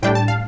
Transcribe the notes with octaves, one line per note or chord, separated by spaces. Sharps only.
A2 G3 D4 G5
A5
F5